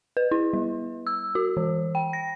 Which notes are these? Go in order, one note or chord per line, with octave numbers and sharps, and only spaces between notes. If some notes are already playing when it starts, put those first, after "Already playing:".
B4
E4
G3
E6
F#4
E3
G5
A#6